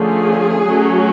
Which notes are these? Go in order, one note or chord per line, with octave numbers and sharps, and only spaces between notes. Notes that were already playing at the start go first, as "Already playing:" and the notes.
Already playing: D3 F3 A3 C#4 G#4
F#3 A3 C#4